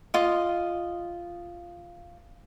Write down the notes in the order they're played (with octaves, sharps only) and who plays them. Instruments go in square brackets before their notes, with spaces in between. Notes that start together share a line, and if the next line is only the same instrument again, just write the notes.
[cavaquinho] F4 D#5